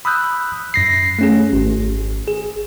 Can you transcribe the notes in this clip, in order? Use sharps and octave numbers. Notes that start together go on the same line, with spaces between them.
B5 D#6 E6 F#6 G6
F#2 A#6 C7
A3 C#4 G#4
G#1
G#4